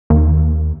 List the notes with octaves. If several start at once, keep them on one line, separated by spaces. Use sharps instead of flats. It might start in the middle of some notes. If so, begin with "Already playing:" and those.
D#2